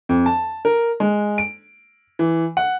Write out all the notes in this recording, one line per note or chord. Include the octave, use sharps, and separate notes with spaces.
F2
A5
A#4
G#3
D7
E3
F#5